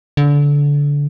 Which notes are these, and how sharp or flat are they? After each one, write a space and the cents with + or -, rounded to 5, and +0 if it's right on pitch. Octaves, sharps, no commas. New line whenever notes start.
D3 -25